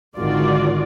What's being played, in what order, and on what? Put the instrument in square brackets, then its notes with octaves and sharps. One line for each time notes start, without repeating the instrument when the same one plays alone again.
[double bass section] G#1 D3 D#3 [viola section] F4 F#4 D5